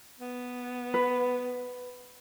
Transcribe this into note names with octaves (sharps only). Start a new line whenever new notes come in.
B3
B4